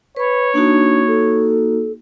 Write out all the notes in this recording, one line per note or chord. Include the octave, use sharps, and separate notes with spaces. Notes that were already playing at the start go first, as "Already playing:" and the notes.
B4 C#5 B5
A#3 D4 D#4 F#4
A4